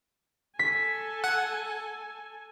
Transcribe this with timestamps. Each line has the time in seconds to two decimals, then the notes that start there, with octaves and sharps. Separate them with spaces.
0.59 A4 G#5 B6
1.24 F#5